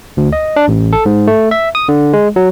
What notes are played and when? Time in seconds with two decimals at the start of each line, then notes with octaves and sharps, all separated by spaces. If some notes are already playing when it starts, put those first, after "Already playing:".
0.17 D2
0.33 D#5
0.56 D4
0.68 A1
0.93 A4
1.06 G#2
1.27 A3
1.51 E5
1.75 D#6
1.89 D3
2.13 G#3
2.36 F#3